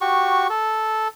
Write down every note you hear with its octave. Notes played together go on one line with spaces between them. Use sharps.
F#4 G4 C#6
A4